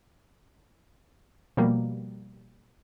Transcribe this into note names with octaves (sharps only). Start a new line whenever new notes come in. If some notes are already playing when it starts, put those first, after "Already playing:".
B2 F3 G3 A#3